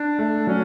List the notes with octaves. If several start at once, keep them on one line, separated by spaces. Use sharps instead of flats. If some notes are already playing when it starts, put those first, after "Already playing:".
Already playing: D4
A3
F#3 C#4